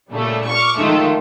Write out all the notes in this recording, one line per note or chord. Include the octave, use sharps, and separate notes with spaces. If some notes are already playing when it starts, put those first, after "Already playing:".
A#2 C#3 G3 A3
C#6 D6 F6
F2 D#3 G#3 A3 F4